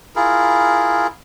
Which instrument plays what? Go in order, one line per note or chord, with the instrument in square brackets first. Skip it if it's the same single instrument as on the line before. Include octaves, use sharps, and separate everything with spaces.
[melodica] E4 F4 G#4 A#4